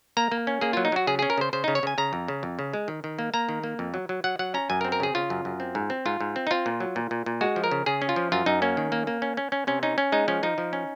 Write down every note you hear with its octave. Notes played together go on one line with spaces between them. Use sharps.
A#3 A#5
A#3
C#4
A#3 G#4
F#3 F4
D#4
F#3 F#4
C#3 G#4
C#4 G#4
A#4
C#3 C5
C#3 C5
C#3 D#4
C#5
C#3 G#5
C#3 A#5
F2
C#3
F2
C#3
G#3
D#3
D#3
A#3
A#3 A#5
D#3
A#3
F2
F#3
F#3
F#3 F#5
F#3 F#5
C#4 A#5
F#2 G#5
A#4
C4
A#4
C#3 G#4
C#3 F4
F#2
F#2
C4
G#2
C4
G#2 F4
G#2
C4
D#4
C4 F4
A#2
F#3
A#2
A#2
A#2
G#3 F#4
F3
A#4
C#3
C#3 G#4
C#4
F4
F3
F#2 F4
F#2 D#4
A#3 C#4
D#3
A#3
A#3
C#4
C#4
C#4
C3 C#4
C#4 D#4
C#4
G#3 D#4
F3 C#4
F3 D#4
F3
C#4